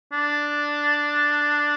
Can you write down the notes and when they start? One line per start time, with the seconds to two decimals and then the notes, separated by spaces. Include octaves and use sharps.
0.13 D4